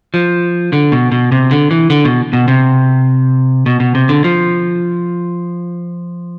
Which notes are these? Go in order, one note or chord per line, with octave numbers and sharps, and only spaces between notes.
F3
D3
B2
B2
C3
D3
E3
D3
B2
B2
C3
B2
B2
C3
D3
F3